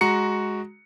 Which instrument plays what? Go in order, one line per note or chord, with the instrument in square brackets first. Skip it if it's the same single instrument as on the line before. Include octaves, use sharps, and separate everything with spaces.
[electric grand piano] G#3 F#4 A#5 C#7